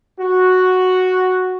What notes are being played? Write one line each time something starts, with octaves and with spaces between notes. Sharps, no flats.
F#4